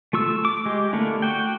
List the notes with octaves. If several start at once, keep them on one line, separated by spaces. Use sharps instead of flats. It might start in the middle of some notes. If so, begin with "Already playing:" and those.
A3 F4 C#6 E6
D6
G#3 G4
D3 A3 A#3 D4 E4
F#4 G5